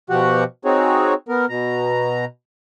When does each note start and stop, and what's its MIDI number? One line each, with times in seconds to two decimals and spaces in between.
0.10 0.44 47
0.10 0.44 53
0.10 0.44 66
0.10 0.44 67
0.10 0.44 78
0.65 1.14 60
0.65 1.14 63
0.65 1.14 66
0.65 1.14 68
0.65 1.14 73
1.29 1.46 59
1.29 1.46 70
1.49 2.25 47
1.49 2.25 82